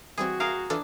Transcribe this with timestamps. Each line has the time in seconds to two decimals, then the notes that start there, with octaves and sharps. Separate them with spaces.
0.18 E3 G3 C4 F#4 G#4
0.40 G#4 A#4 F5
0.70 E3 D4 F4 A4